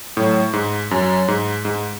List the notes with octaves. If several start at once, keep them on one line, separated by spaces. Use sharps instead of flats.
A2 F#3
G#2
F#2 F#3
G#2
G#2